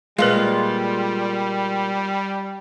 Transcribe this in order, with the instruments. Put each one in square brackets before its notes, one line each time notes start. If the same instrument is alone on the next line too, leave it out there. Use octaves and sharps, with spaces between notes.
[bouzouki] A#2 F4 [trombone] G3 [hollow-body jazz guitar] G#3 [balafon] B4 F5